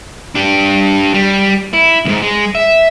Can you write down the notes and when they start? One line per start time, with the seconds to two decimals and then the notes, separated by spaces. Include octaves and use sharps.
0.35 D4 G4
1.14 G3
1.74 E4
2.05 C#2 G#2
2.22 G#3
2.55 E5